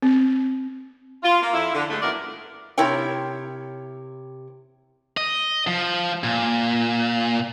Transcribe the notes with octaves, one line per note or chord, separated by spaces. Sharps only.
C4
F4
A#3
F2 E4
D3
G2 D3 F3 G#3 A3
F#2 A#2 B3 E4 A#4 D5
C3 E4 A#4 C#5 G5
D#5
F3
A#2